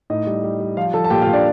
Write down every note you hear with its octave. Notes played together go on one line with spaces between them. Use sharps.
A2 D#4 D#5
G3
G3
G3
F3 F4 F5
F3 A4 A5
A5
A#2 G4 G5
F4 F5
A#2
D4 D5